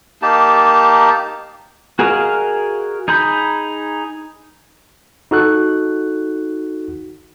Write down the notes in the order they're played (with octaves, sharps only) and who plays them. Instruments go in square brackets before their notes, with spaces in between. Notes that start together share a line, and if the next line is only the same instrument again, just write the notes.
[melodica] A#3 D#4 G4 A5
[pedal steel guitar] F#4 G#4 A#4 D#5 F5
D#4 G#4 A#5 B5 G6
[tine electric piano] D#4 F#4 A4 F#6